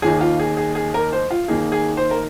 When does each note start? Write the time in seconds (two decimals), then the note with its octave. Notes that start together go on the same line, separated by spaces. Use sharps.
0.02 D#2 D#3 A#3 D#4 G#4
0.21 F4
0.39 G#4
0.57 G#4
0.75 G#4
0.94 A#4
1.13 C5
1.30 F4
1.48 D#2 D#3 A#3 D#4 G#4
1.72 G#4
1.97 C5
2.11 A#4